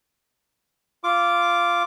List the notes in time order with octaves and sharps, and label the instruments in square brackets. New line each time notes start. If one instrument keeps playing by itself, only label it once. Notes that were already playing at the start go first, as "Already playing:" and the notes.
[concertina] F4 D6